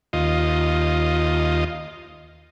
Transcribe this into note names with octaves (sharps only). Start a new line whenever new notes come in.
D#2 F4 D#5